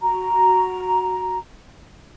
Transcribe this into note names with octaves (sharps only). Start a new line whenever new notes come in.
F#4 A#5